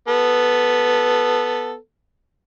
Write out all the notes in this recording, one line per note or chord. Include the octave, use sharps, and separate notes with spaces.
B3 A4